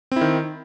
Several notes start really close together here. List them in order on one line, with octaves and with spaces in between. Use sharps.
C4 E4 D#3